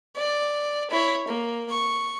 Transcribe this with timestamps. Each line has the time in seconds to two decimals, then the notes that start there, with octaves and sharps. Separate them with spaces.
0.16 D5
0.90 E4 C#5
1.27 A#3
1.71 C#6